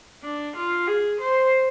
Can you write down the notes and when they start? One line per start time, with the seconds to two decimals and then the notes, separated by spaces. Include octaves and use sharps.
0.23 D4
0.55 F4
0.87 G#4
1.20 C5